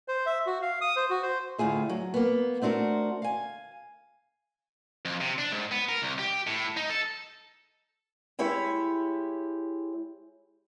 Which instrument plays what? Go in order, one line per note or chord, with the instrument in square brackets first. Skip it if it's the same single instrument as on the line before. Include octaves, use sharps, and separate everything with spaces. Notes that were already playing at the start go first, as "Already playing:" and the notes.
[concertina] C5
E5
F#4
F5
D#6
C5
F#4
C5
[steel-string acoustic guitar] D2 A2 F4 G#4 E5
F#3
A#3 B3
A3 C4 D4 F#4 A#4
F5 G#5
[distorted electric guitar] F2
C3
D4
G#2
B3
A#4
C2
G4
A2
D#4
A4
[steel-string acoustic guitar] G#3 E4 G4 C#5